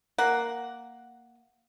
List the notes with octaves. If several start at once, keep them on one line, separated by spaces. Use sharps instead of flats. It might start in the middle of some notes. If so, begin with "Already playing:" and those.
A#3 F#5